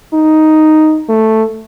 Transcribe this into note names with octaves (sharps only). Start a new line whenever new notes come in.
D#4
A3